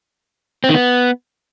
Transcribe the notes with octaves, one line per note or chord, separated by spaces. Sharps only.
C4
D#3
B3